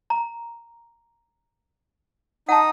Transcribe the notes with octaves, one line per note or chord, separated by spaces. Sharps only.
A#5
D#4 F#5 A5 D#6